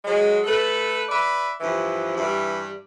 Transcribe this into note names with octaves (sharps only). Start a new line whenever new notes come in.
F#3 G#3
A3 A4 B4
B4 D5 E5
G2 E3 F3
G2 E3 G3